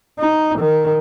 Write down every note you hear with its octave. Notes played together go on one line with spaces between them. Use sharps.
D#4
D#3